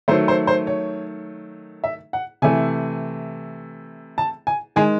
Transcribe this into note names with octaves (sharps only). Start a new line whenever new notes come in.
D#3 F#3 A3 C5
C5
C5
C#5
E5
F#5
C3 E3 A3 G#5
A5
G#5
D#3 G#3 G#5